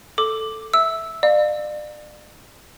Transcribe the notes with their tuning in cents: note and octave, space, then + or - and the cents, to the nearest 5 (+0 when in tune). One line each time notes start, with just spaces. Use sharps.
A4 +0 D6 +0
E5 -10 E6 -5
D5 +35 F5 +15